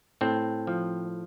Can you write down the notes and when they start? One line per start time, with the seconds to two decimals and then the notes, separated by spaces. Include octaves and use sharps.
0.21 A2 C4
0.67 F3